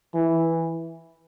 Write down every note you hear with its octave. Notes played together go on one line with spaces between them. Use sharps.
E3